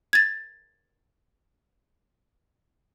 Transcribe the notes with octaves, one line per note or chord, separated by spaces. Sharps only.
G#6 A6